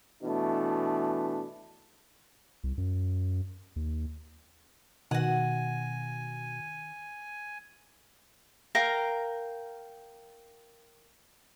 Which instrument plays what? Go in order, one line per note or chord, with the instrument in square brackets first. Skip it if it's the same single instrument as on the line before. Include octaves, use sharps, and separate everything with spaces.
[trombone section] B2 E3 A3 D4
[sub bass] C2
F#2
D#2
[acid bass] B2 [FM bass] D#3 [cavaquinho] F#4 F#5 [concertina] G#5
[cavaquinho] A#4 F5 G5 A#5